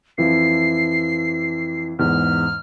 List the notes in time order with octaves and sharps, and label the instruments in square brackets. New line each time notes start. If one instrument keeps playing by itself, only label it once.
[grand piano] F2 E3 F3 [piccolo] C7
[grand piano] E2 G#2 [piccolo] F6